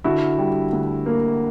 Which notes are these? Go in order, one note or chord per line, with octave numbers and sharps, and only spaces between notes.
D3 E4 F#4
G3
D2
A#3